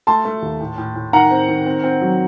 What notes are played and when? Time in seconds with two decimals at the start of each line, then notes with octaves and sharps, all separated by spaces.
0.07 A3 A5 C6
0.25 A3
0.42 D#2
0.60 A2
0.78 A2
0.96 A2
1.13 D#3 F#5 A#5
1.31 C4
1.49 D#3
1.66 C4
1.83 C4
2.01 F#3